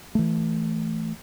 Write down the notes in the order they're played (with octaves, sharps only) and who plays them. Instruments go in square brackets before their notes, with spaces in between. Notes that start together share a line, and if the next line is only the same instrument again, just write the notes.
[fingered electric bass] E3 A3